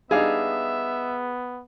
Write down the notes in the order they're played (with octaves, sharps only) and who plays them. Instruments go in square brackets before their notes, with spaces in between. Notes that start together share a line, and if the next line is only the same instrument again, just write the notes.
[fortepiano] G3 D4 D#4 [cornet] B3 [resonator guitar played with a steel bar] G#4 F5 [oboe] E5